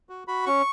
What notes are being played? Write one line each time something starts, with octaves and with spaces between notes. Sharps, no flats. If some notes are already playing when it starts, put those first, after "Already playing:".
F#4
F#4 B5
C#4 C#6